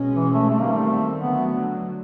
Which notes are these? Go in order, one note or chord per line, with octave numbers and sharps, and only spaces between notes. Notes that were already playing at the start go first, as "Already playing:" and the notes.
Already playing: B2 G#3 C#4
E3
A3
D#3 G3 A3 C4
A#3
A3
D3 F#3 A3 B3